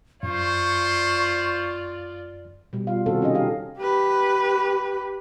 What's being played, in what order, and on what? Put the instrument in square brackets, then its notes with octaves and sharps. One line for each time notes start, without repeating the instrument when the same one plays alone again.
[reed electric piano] F#2 [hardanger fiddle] F4 D5 [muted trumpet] C5 [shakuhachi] C#6
[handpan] B2 G3
F4 F5
C3 D#3 C4 F#4 A4
C3 C#4 D#4 G#4 D#5
D#4 G4 F5
[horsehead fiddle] G4 B4